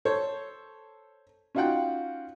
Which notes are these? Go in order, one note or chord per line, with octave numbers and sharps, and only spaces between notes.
A4 C5 C#5
C#4 D#4 F4 F#4 F#5 G5